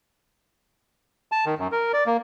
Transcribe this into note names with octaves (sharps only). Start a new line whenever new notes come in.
A5
D#3
F#2
A#4
D5
A#3